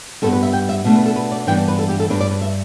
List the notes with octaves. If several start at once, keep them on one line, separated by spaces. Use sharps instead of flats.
G2 G3 B3 A4
B4
E5
G5
E5
B2 A3 D4
B4
A4
B4
D5
G2 E3 B3 D4 G5
D5
B4
A4
G4
A4
G2 G3 D4 B4
D5
B4
E5